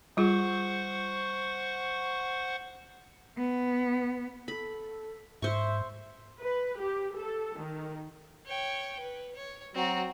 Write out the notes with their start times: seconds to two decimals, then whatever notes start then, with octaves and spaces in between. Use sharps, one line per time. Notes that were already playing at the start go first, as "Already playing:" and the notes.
0.17 G3 F4 G#4 C5 F#5 C#6
3.37 B3
4.48 A4 B5
5.42 G#2 C5 E5 C#6
6.41 B4
6.82 G4
7.17 A4
7.59 D#3
8.47 C#5 G5
9.00 B4
9.35 C#5
9.75 F#3 C4 F#4 A#5